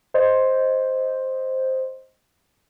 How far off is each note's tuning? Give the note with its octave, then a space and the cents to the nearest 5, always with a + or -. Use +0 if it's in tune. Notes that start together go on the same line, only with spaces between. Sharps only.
C5 +0 D#5 +0